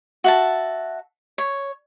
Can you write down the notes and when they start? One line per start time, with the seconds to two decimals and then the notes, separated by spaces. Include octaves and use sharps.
0.24 F#4 E5 A5
1.38 C#5